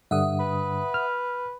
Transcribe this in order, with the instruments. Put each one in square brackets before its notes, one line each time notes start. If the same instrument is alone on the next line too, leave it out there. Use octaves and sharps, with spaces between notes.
[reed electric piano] G2 D3 [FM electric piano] E5 F#5 D#6
[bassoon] B4
[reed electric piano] F6